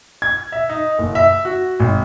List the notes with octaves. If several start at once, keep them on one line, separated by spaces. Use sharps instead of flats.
G#6
E5
D#4
F#1
E5
F#4
G#1